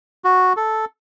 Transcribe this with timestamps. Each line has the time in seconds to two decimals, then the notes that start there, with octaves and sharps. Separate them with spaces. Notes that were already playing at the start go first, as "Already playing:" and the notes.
0.24 F#4
0.57 A4